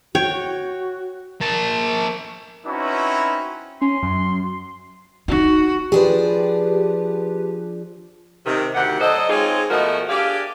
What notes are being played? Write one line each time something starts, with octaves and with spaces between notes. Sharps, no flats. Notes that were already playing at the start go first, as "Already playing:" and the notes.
F#4 C#5 G5
A#3 A5
C4 C#4 D#4 E4 F#4 B4
C#4 C6
F#2
D#4 F4 F#4
F3 D4 G4 G#4 B4
C3 D#3
D2 C3 D#3 G4 F#5
F#3 A4 C5 D5 D#5
G#3 C4 D#4 F4 G#4 C#5
B2 F3 A3 F#4 A#4 D#5
D4 G4 G#4 D5 F5